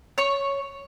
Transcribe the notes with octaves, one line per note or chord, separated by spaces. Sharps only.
C#5 C#6